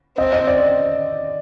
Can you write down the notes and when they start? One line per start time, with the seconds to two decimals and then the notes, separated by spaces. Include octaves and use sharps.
0.18 C4 D#5
0.33 D#5
0.47 D5